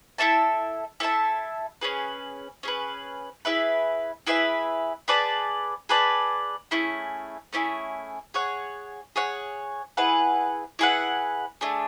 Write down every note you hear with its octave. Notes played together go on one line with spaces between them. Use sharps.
E4 A4 E5 A5
E4 A4 E5 A5
C#4 G#4 B4
C#4 G#4 B4
E4 G#4 B4 E5
E4 G#4 B4 E5
G#4 B4 D5 A5
G#4 B4 D5 A5
A3 C#4 E4 G#4
A3 C#4 E4 G#4
G#4 C#5 F#5
G#4 C#5 F#5
E4 G#4 B4 F#5
E4 G#4 B4 F#5
A3 D4 G#4